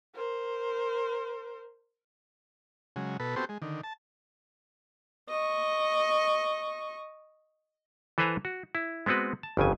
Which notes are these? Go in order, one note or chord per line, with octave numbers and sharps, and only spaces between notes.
A#4 C5
C#3 F#3 G#3
B2 A4 B4
B3 C4 F#4 G4 A4 C5
G#3
D3 D#3
A5
D#5 C#6
E3 A4 B4 C5 G#5 A#5
F#4
E4
G#3 B3 C4 F#4 B4
A5
G1 F2 C#3 G#5